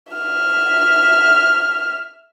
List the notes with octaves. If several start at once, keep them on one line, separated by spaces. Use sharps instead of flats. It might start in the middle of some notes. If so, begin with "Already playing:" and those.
E5 F6